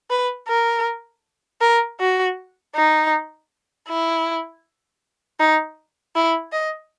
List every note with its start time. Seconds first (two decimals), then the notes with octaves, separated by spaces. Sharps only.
0.10 B4
0.48 A#4
1.61 A#4
2.00 F#4
2.75 D#4
3.88 E4
5.39 D#4
6.16 E4
6.52 D#5